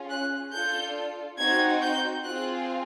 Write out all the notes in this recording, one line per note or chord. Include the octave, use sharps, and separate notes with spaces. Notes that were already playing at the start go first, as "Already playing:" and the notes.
Already playing: C#4 F4 G#4
F#6
D4 F4 A4 G6
C4 D#4 F#4 G#6
G6
C4 F4 G#4 F#6